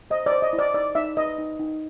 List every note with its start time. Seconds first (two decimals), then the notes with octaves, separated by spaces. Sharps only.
0.10 C5 D#5
0.26 D5
0.32 C5
0.42 D#5
0.53 E4
0.59 D5
0.74 D#4 D5
0.95 D#4 E5
1.17 B4 D#5
1.38 D#4
1.60 D#4